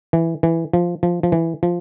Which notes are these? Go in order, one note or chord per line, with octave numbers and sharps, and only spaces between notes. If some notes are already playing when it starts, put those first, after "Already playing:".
E3
E3
F3
F3
F3
E3
F3